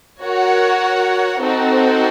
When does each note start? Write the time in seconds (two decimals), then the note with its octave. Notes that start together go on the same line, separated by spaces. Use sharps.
0.21 F#4 A#4 C#5 F#5
1.42 C4 D#4 F#4 A4